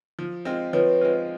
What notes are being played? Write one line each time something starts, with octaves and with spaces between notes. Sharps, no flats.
F3
G#3 C4 F4
F3 B4 C#5
G#3 C4 F4